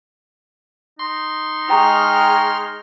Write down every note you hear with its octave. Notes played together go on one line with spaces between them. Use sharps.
D#4 C6
G#3 G5 A#5 C#6 F6